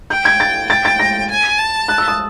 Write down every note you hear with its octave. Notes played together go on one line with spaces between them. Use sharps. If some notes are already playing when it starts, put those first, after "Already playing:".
G5 G6
G#6
A6
G5 A6
A6
A#6
G#5
A5
F#6
E6
D#6